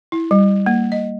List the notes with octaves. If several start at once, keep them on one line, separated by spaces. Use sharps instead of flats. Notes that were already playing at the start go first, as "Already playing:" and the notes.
E4
G3
A#3
D#5